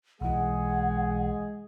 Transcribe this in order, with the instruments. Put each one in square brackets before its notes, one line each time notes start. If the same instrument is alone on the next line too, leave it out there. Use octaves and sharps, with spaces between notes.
[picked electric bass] B1 E3 [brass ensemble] G#3 G#4 [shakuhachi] F#5